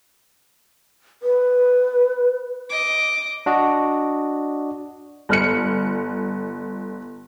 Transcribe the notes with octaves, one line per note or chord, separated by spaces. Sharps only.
B4
D#5 D6
D4 F#4 D5 D#5
G1 F6 C#7